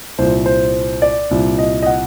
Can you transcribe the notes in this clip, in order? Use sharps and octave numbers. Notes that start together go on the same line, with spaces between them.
C2 A#2 C5
C5
D5
C2 A#2
D#5
D#5
F#5